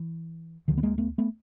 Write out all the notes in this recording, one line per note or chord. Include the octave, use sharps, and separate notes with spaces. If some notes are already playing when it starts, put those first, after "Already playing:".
Already playing: E3
D2 D3 D#3 F3
B3
G#3 A#3
A3 B3
A3 B3